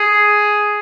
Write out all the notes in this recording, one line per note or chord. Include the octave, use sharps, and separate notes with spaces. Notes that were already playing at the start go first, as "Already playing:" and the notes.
Already playing: G#4